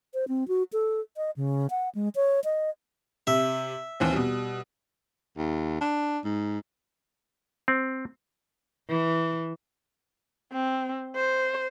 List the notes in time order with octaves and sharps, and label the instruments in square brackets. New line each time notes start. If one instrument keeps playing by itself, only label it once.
[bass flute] C5
C4
F#4
A4
D#5
C#3
F#5
G#3
C#5
D#5
[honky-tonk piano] C3 [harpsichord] E5
[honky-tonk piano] D#2 E3 C4
B2 G3
[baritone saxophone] D#2
D4
G#2
[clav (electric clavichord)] C4
[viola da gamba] E3
[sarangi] C4
C5